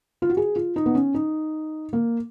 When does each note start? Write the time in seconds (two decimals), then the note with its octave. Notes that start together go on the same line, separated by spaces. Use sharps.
0.22 F4
0.29 F#4
0.37 G#4
0.56 F4
0.76 D#4
0.86 B3
0.95 C#4
1.14 D#4
1.93 A#3